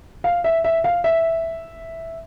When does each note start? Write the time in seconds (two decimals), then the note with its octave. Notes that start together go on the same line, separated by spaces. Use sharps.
0.24 F5
0.44 E5
0.64 E5
0.84 F5
1.04 E5